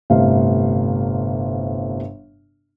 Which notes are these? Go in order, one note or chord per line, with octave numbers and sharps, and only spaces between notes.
G1 A2 C3 F5